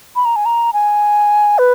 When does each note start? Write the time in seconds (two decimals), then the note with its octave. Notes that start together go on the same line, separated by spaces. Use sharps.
0.16 B5
0.25 A#5
0.36 G#5
0.45 A#5
0.73 G#5
1.58 B4